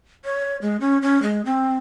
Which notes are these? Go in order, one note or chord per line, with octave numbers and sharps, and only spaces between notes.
C#5
G#3
C#4
C#4
G#3
C4